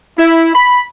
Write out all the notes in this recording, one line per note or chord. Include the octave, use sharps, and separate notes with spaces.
E4
B5